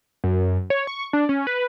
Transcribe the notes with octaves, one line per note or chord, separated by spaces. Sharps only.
F#2
C#5
C#6
D4
C#4
B4